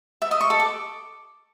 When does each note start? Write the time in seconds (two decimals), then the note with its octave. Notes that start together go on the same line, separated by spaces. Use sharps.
0.22 E5
0.31 D#5
0.41 C#6
0.50 A4
0.60 D6